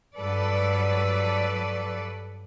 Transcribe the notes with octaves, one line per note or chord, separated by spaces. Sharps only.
G2 F#3 A4 B4 D5